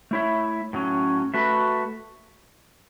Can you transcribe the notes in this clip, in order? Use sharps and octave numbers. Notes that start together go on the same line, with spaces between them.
A3 E4 C#5 E5
A2 F#3 C#4
A3 F#4 B4 E5